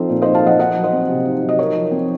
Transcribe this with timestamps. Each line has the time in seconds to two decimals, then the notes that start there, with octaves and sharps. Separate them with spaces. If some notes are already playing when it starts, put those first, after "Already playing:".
Already playing: F3 C4 D#4 A4 C5
0.09 A#2
0.22 D#4 C5 D#5
0.34 F5 A5
0.43 F3 D#5 F#5
0.60 D#4 D#5 F#5
0.75 F#3
0.84 C5 D#5
0.93 C4
1.09 C3
1.25 D#4
1.42 F#3
1.49 D#5
1.59 D#4 A#4 C#5
1.75 F3
1.91 C4